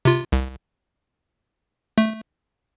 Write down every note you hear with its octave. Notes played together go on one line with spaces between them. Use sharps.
C3 F4
C2
A3